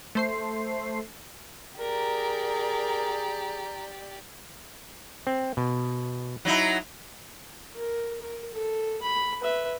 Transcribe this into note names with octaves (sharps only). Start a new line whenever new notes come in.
A3 C5 C7
G4 G#4 A#4 D5 A#5
C4
B2
F#3 D#4 E4
A#4
A#4
A4
B5
B4 E5